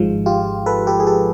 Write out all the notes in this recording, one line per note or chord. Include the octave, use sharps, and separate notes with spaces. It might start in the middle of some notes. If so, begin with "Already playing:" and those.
Already playing: G#1 G#2 F3 G#3
F4 G4
A4 B4
G4 A4
G#4
G4 A4